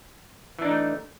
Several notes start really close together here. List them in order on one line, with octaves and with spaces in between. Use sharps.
E3 D4 D#4 A3